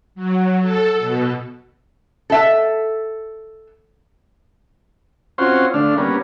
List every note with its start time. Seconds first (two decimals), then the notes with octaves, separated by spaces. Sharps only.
0.15 F#3
0.61 A4
0.99 B2
2.30 A4 E5
5.38 C4 C#4 F4 F#4 C5
5.74 D3 A3 D4 F5
5.97 G3 A#3 B3 C#4